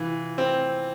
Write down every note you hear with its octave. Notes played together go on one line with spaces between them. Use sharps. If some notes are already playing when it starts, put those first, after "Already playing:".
Already playing: C3 E3 F4
C4